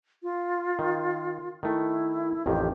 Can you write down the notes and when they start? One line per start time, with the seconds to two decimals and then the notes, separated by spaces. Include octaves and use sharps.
0.23 F4
0.79 D#3
1.63 D#3 A3 E4
2.46 A1 F2 D#3 G4